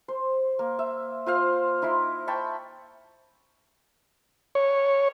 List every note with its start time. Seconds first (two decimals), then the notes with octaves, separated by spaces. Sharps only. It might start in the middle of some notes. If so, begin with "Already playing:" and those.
0.08 C5
0.59 A#3
0.79 E5
1.26 F4 C5 F5
1.82 D#4 E4 E5 C6
2.27 G5 A5 B5 C#6
4.55 C#5